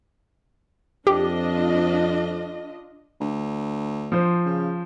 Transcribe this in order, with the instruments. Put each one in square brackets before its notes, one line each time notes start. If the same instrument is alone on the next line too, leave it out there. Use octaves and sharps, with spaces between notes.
[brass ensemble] F2 [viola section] D4 F4 D#5 [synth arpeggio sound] G4
[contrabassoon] D2
[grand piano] F3 C5
[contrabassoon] C#3